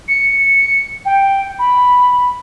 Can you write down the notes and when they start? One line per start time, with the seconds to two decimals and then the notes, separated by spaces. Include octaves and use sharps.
0.08 C#7
1.05 G5
1.59 B5